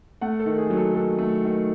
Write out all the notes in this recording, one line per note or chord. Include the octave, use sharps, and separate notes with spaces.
A3 F#5
A4
D#3
G#4
F#3
A4
D#3 A4
A3
D#3